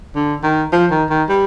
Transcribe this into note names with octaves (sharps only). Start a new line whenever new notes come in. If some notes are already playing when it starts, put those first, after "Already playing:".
D3
D#3
F3
D#3
D#3
G3